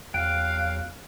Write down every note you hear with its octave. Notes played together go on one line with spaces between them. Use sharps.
E2 F#3 F5 G5 F#6